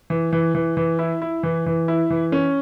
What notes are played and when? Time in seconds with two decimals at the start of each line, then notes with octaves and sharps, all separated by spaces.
0.10 E3
0.33 E3
0.55 E3
0.77 E3
0.99 E4
1.22 E4
1.43 E3
1.66 E3
1.88 E4
2.10 E3
2.32 C#4